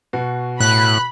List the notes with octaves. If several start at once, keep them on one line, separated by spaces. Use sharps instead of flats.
B2 F#4
A2 B5 F#6